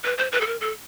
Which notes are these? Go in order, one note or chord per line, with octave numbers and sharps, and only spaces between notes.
B4
C5
B4
A4
A#4
A4